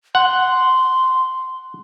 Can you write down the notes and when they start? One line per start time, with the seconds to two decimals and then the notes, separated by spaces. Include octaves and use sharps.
0.15 F#5 C6